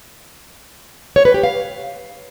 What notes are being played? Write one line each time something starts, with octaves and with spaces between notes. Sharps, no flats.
C#5
B4
G4
F5